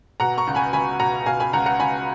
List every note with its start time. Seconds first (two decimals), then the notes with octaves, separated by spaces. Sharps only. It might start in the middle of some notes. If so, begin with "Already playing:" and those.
0.20 B2 F#5 A#5
0.38 A#5 C#6
0.47 C#2
0.55 G#5 B5
0.73 C#2 G#5 B5
1.00 B2 F#5 A#5
1.26 B2 F5 G#5
1.40 G#5 B5
1.53 C#2 F#5 A#5
1.66 F#5 A#5
1.80 C#2 G#5 B5